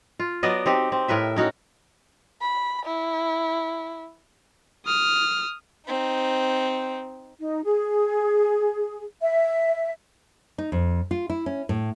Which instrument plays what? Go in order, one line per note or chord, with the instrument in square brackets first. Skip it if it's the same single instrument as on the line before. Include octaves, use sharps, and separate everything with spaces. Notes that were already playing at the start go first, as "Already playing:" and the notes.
[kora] F4
F#3 B3 D5 D#5
C4 D#4 G4
C4
A2 A#4 B4 E5
C#4 D#4 F#4
[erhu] B5
E4
[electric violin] D#6 F6
[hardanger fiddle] C4 D#4
[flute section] D#4
G#4
E5
[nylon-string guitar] D#4
F2
F4
E4
C#4
A2